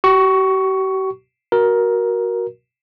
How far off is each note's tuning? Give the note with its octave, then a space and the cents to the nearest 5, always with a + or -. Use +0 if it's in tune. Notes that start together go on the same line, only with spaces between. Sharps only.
G4 -45 C#6 +10
F#4 +0 A#4 +15